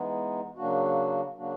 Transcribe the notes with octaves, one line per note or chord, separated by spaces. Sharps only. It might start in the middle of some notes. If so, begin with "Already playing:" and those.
Already playing: E3 G#3 B3 D#4
C#3 F#3 A#3 D4 F#4
C#3 F#3 A#3 D4 F#4